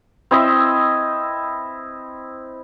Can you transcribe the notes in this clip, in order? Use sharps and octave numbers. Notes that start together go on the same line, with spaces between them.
C4 E4 D#5 E5